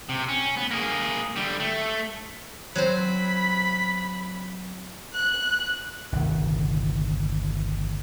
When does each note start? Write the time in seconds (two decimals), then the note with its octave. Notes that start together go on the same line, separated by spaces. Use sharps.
0.09 C3
0.28 C#4
0.57 B3
0.71 A#3 G#4
1.36 D3 G3
1.60 A3
2.75 F#3 C4 C5 B5
5.14 F#6
6.12 G1 C2 D#3